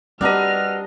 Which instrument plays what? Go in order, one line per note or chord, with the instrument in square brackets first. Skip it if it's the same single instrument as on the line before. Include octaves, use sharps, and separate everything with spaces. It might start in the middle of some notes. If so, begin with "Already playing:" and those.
[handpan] G3 [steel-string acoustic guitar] C4 F#4 B4 [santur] D4 A#4 D#5 [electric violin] F6